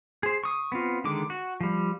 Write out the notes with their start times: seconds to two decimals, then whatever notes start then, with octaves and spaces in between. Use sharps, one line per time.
0.23 G#4 C5
0.44 C#6 D#6
0.72 B3 C4 F4
1.04 D3 D#3 G#3 D6
1.30 F#4
1.60 F3 G3